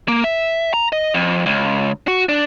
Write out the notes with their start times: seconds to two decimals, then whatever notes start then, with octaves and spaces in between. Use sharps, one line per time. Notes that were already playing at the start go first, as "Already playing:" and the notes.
0.08 A#3
0.24 E5
0.74 A#5
0.93 D#5
1.14 F2
1.46 C#2
2.08 F#4
2.29 D4